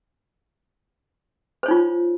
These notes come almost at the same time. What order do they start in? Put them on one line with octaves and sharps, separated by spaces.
C5 C#5 D#4 F4